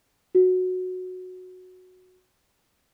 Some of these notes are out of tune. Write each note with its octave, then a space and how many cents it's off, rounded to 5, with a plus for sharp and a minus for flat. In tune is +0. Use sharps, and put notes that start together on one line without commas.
F#4 -10